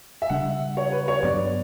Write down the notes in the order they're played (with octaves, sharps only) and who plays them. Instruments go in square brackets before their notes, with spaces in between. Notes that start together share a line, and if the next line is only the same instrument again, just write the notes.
[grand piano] E5
[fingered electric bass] C#3 G3 D4 [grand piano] F#5
[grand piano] C#5
B4
C#5
[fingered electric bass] G2 F#3 B3 D4 [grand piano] D5